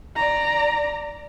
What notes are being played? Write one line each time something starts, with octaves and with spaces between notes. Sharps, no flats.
D5 A#5